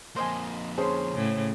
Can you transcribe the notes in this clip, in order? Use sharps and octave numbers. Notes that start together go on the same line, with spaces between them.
F2 A#3 C5 D#5 G#5
C#4 G#4 C5 A5 C6
A2 C#3